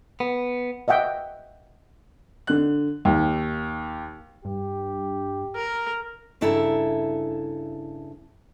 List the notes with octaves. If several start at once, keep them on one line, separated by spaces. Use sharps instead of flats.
B3
D#5 E5 F#5 G5
D3 F#6
D#2
G2 G4
A#4
G2 C#3 E4 A4 E5 A#5